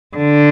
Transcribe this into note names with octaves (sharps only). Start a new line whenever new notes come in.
D3